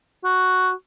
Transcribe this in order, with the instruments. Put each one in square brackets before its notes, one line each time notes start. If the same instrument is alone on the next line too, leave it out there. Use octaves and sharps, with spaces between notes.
[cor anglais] F#4